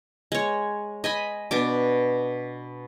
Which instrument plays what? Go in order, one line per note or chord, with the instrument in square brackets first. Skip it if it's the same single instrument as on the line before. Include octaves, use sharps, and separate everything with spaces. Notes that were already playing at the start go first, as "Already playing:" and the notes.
[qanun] G#3 C#5
D#5 G#5 B5
B2 D4 D6